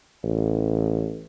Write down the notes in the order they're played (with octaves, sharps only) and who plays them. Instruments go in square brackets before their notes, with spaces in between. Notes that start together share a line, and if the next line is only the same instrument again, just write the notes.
[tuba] A1